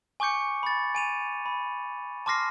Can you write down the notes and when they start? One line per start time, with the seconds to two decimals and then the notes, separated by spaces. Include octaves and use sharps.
0.20 G#5 C#6 D6 G6 C#7
0.63 B5 A6
0.95 G#5 D#7 F7
1.46 B5
2.26 A5 C6 D6 F6 A#6 C7